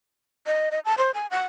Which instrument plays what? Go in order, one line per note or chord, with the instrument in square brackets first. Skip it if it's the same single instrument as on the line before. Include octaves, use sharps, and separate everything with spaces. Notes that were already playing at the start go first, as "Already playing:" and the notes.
[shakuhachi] D#5
D#5
A5
C5
G#5
F#5